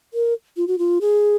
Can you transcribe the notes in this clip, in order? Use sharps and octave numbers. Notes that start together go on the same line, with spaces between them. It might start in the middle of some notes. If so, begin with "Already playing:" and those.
A#4
F4
F#4
F4
G#4